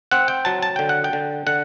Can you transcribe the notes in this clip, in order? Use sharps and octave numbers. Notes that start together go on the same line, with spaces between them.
C4 F#5
G5
F#3 A5
A5
D3 G5
F#5
G5
D3
D3 F#5